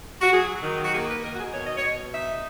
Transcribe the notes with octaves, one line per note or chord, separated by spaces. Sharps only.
F#4
F#3 G#4
D#3
F#4
A#3 G#4
B4
D#3 A#4
F#4
G#4
B2 C#5
D#5
C#5
B2
D#4 E5